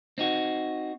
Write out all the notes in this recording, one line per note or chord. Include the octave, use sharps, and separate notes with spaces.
C4 D#4 F#4